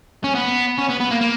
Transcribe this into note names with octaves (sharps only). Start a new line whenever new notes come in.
C#4
B3
C#4
B3
B3
A#3
A#3